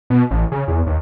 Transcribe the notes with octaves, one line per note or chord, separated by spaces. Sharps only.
B2
A1
C#3
E2
D#2